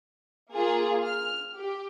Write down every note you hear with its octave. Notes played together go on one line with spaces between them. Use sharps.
A#3 F4 G#4
F6
G4